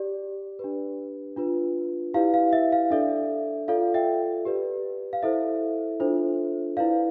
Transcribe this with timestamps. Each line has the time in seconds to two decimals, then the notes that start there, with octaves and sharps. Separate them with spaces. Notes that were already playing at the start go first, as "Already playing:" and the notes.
Already playing: G4 D5
0.59 D4 G4 B4
1.36 D4 F4 B4
2.14 E4 G4 B4 D5 F5
2.34 F5
2.53 E5
2.72 F5
2.91 D4 A4 D5 E5
3.68 F4 A4 D5 F5
3.94 E5 G5
4.45 G4 B4 D5
5.13 F5
5.23 E4 A4 C5 E5
6.00 D4 F4 A4 C5
6.77 E4 B4 D5 F5